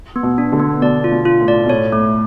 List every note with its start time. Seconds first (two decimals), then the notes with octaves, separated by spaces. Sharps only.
0.16 B3
0.23 B2
0.38 D4
0.52 B2 D3
0.59 B3
0.82 B2 D5
1.04 F4
1.12 B2
1.25 F4
1.41 A2
1.48 D5
1.66 B2
1.70 A2 C#5
1.92 A3